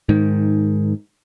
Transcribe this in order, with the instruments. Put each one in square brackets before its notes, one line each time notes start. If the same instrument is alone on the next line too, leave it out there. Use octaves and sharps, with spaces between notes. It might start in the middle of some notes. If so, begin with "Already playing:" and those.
[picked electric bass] G#2 D#3